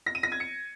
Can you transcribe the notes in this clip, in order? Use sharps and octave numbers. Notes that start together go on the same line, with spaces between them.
A#6
D#7
A#6
G#6
C#7